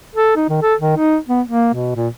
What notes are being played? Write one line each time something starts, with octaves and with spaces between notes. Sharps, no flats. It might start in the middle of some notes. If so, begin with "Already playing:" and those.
A4
D#4
D#3
A4
D#3
D#4
B3
A#3
B2
A#2